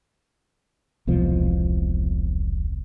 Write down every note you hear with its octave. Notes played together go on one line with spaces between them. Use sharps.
E1 C2 B2 F3